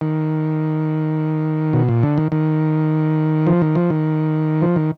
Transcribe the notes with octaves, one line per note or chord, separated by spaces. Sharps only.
D#3
B2
A#2
D3
D#3
D#3
F3
D#3
F3
D#3
F3
D#3